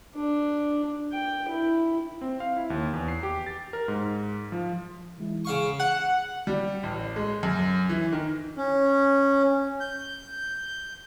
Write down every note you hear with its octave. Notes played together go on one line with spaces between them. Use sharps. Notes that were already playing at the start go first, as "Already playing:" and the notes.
D4
G5
E4
C4
F5
E4
D#2
E2
C7
G4
A6
A#4
G#2
F3
E3 G#3 E4
C#3 F5 C#6
F#5
G3
A1
G#3
F#2
E3
D#3
C#4
G6